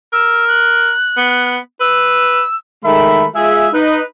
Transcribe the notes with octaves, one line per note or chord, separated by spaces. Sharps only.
A#4 E6
F#6
B3
B4 E6
D#3 G#3 A3 A#4 E5 B5
G#3 F4 G#4 E5
D#4 B4 D#5